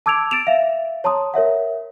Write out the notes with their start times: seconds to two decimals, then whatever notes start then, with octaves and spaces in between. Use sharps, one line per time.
0.06 A5 D6 E6 G#6 D7 F7
0.31 A6 D7 E7 F7
0.47 E5 F5
1.04 C#5 A5 A#5 C6 D#6
1.34 A#4 C#5 E5 F#5